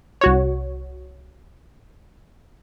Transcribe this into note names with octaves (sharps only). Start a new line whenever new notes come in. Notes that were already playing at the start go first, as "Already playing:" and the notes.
C2 F#4 C#5